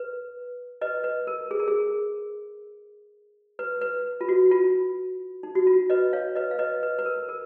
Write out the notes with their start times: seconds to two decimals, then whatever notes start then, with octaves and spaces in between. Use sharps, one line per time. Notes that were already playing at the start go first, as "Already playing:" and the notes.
Already playing: B4
0.81 B4 D#5
1.04 B4
1.27 A#4
1.51 G#4
1.59 A#4
1.68 G#4
3.59 B4
3.81 B4
4.21 F4
4.29 F#4
4.51 F4
5.43 D#4
5.55 F#4
5.67 F4
5.90 B4 D#5
6.13 C#5 F5
6.35 B4 D#5
6.51 F5
6.59 B4 D#5
6.83 B4
6.99 B4
7.05 A#4
7.29 A#4